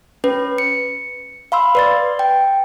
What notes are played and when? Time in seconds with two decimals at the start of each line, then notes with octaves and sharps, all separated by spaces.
0.24 C#4 B4
0.58 C#7
1.52 F5 B5 C6 E6
1.75 B4 D5 A6
2.19 G5